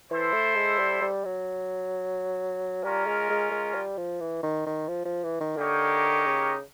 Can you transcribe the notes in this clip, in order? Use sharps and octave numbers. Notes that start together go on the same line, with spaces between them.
E3 E4 A4 C5
A3
G#3
G3
G3
F#3
G3 C#4 F4 A#4
G#3
G#3
G#3
G3
F3
E3
D#3
D#3
F3
F3
E3
D#3
D3 A#3 D#4 G4 A#4 C#5
C#3